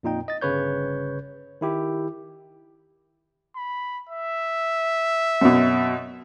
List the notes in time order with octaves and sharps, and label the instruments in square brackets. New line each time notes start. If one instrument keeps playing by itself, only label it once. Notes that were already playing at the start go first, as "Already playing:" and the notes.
[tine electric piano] F2 A#2 D#4 G5
D#5 A6
G1 C#3 B4 C#5 G6
D#3 E4 G4
[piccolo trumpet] B5
E5
[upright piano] F#2 B2